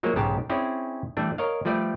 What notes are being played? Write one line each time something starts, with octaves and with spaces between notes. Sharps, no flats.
F3 F#3 G#3 A#3
B1 G#2 C#3 G4 A5
C4 C#4 E4 G#4 C#5 D5
E3 G3 A3 D4
A#4 C#5 D#5 F5
F3 G3 A3 B4 D5